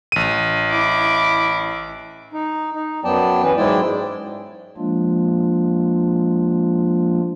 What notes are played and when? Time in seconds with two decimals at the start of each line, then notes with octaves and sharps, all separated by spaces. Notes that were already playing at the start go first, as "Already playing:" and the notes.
0.12 A1 D#7
0.71 E4 D6
2.33 D#4
2.75 D#4
3.04 F#2 F#3 B3 D5 G5 A5
3.43 E3 C#4 B4
3.57 G#2 F#3 G#3 E4 D5 G5
4.77 F3 G#3 A#3 D4 F4